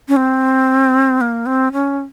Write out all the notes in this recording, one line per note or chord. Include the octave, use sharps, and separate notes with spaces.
C#4
C4
A#3
C4
C#4